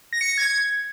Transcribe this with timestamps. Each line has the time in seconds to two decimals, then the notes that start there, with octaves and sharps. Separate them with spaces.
0.13 A#6
0.21 C#7
0.29 A#6
0.38 G#6